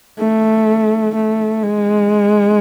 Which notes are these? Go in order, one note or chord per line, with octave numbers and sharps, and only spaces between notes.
A3
A3
G#3